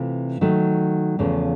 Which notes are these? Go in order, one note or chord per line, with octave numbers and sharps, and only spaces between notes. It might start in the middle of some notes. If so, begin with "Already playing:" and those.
Already playing: C3 E3 A3 F4
D#3 F#3 A3
E2 C#3 F3 A3